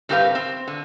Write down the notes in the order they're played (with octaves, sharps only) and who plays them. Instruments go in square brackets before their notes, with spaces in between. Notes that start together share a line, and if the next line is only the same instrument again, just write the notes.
[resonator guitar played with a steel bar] G2 C4 G4 A#4 B4 F5
C4
D3